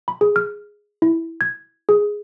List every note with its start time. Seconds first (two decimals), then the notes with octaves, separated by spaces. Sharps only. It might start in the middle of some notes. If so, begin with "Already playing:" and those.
0.08 B5
0.21 G#4
0.36 F6
1.02 E4
1.41 G#6
1.89 G#4